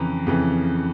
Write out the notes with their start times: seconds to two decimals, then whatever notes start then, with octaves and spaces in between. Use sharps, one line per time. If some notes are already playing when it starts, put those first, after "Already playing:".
Already playing: F2 C#3 E3 A#5
0.26 F2 C#3 E3